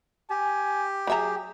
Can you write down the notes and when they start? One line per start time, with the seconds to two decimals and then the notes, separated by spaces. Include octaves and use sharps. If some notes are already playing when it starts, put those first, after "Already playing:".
0.30 G4 G#5
1.07 F#3 G#4 E5 A#5